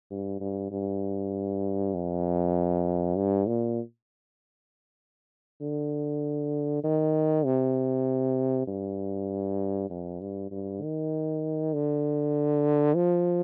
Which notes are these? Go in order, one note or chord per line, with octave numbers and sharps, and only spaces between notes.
G2
G2
G2
F2
G2
A#2
D3
D#3
C3
G2
F2
G2
G2
D#3
D3
F3